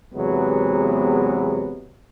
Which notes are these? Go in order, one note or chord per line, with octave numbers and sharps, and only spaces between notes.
E2 C3 F#3 G#3 B3